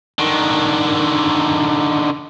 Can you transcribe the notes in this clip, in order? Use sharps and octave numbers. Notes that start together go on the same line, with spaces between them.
D3 D#3